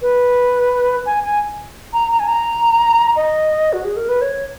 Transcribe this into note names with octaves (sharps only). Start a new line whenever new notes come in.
B4
G#5
G#5
A#5
A#5
G#5
A#5
D#5
F#4
G#4
A#4
B4
C#5